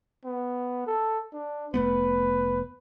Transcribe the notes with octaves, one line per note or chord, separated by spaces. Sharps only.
B3
A4
D4
F1 A3 B3 B4